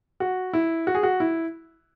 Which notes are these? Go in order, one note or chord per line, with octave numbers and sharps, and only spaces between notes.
F#4
E4
F#4
G#4
F#4
E4